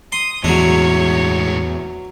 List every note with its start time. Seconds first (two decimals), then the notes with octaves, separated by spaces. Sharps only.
0.12 C6 D#6
0.44 E2 A2 F#3 G#3 D4 C#5